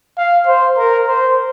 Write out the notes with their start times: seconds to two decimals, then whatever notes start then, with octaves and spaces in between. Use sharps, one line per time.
0.17 F5
0.47 C5
0.77 A#4
1.07 C5